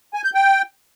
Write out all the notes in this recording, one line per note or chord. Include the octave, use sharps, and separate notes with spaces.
G#5
G6
G5